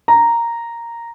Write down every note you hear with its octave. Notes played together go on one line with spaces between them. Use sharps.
A#5